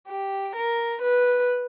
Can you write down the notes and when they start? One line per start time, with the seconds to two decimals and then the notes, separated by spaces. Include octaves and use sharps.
0.09 G4
0.56 A#4
1.02 B4